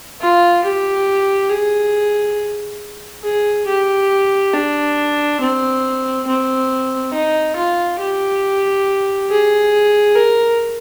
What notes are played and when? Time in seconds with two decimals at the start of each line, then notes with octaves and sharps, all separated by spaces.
0.21 F4
0.64 G4
1.50 G#4
3.23 G#4
3.67 G4
4.53 D4
5.40 C4
6.27 C4
7.13 D#4
7.56 F4
7.99 G4
9.29 G#4
10.16 A#4